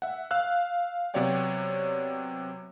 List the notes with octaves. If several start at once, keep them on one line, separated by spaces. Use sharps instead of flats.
E5 F#5
F5 E6 F#6
C3 F#3 B3 C#5 D5 G5